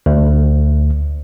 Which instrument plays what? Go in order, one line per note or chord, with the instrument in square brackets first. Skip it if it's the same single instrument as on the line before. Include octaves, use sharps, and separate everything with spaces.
[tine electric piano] D2